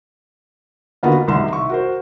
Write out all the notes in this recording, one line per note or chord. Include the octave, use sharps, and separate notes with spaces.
D3 A#3 B3 D#4 F4 F#4
F#5
C2 C3 D#3 A#5 C6 E7
E5 C#6
F#4 A#4 C5